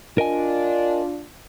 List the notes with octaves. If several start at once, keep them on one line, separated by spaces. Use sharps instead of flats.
D4 F4 A#4 D#5 G#5